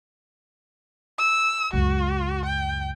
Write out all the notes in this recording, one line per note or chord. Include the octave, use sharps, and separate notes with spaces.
E6
C#2 F#2 F#4
G5